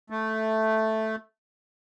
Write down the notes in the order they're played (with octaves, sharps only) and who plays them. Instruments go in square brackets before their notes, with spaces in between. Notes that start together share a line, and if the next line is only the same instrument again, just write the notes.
[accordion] A3